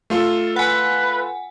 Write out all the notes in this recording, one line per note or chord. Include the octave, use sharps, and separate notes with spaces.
A3 F4 A4
B4 F#5 G#5